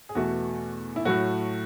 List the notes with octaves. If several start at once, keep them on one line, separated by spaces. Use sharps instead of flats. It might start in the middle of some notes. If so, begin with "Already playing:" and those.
G#4
E2 B2 A3 F#4
E4
A2 F#3 A3 F#4